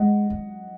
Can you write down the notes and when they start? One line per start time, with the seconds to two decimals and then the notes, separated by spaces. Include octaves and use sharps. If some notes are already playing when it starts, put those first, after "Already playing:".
Already playing: G#3 D#5 F#5
0.30 F#3